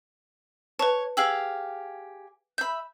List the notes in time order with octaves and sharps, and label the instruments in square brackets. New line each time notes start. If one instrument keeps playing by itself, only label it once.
[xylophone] B4 A5 [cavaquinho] C#5
[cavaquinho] G4 G#4 F5 [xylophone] E6 F#7
[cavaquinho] E5 B5 [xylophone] G6